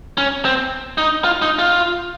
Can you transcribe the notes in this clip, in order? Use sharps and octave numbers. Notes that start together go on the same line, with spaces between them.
C#4
C4
D#4
F4
D#4
F4